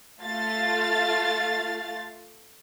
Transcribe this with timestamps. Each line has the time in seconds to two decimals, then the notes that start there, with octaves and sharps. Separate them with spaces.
0.23 A3 F4 F5 A6